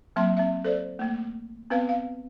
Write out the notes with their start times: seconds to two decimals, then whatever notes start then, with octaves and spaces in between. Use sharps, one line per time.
0.16 F#3 A#3 C4 E5 A5 C6
0.37 C4 E5
0.65 A4 C5 D5
0.99 A3 A#3
1.70 B3 C4 B4 F5
1.89 F5